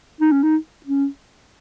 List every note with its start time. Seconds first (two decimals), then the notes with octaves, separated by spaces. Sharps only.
0.21 D#4
0.32 C#4
0.43 D#4
0.86 C#4